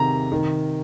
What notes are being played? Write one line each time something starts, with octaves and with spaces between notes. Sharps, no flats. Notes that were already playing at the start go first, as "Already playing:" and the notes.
Already playing: C3 D#3 A#5
C3 D#3